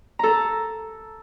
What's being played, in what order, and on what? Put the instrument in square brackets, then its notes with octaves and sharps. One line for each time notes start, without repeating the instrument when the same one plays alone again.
[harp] A4 A#5